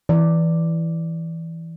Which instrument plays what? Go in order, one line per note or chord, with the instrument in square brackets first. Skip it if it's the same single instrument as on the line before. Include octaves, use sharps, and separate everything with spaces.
[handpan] E3 D5